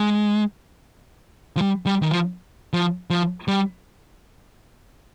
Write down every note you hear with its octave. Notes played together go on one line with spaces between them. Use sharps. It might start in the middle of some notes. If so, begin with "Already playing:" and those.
Already playing: G#3
F3
G3
G3
D#3
F3
F3
F3
G3